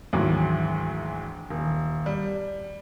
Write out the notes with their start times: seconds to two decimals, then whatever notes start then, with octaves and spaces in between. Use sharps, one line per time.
0.13 D2 G#2 D#3 E3 F#3
1.50 D#1
2.06 G3